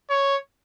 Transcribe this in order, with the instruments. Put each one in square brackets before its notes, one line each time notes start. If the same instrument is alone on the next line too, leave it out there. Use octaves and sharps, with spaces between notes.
[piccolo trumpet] C#5